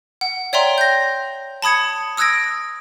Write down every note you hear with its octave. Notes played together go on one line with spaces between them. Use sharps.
F#5
C#5 D5 E5 G5 A#5 C6
G6 A#6
A5 B5 D#6 G#6 C#7
D#6 E6 F#6 G#6 A#6 D7